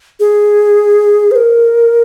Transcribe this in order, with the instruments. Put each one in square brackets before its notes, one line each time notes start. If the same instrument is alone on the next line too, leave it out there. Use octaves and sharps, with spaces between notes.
[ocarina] G#4
C5
A#4